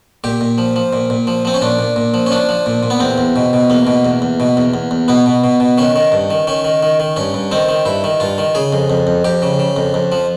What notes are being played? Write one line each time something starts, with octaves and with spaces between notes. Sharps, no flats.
A#2 G4
A#2
F3
F3
A#2
A#2
F3
F3 C4
C#4
A#2 D4
A#2
A#2
F3
C#4
F3 D4
F3
A#2
A#2
B3
E2 C4
E2
B2
B2
E2 A#3
B2
E2
E2
B2
E2
E2
E2
B2 B3
B2
B2
B2
D#3 C#4
D#3
G2
D#3
D#3 C#4
D#3
D#3
D#3
G2 C#4
G2
D#3 C4
D#3
G2 E4
D#3
G2 F4
D#3
C#3 G#4
F2
F2
F2
F2 G4
C#3
C#3
F2
F2
F3